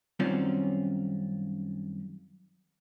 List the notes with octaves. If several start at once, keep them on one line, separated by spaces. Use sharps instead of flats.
F#2 D#3 G3 C4 C#4 F4